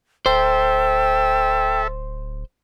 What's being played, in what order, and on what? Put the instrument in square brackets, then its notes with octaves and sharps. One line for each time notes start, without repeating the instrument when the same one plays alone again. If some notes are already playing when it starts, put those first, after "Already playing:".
[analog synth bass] D1 [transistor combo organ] A4 E5 [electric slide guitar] C5 [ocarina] G5